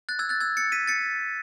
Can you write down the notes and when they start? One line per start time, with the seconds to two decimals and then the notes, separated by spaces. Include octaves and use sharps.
0.09 F#6 A6
0.19 E6 G#6
0.29 F#6 A6
0.41 E6 G#6
0.57 A6 C#7
0.72 B6 D#7
0.87 A6 C#7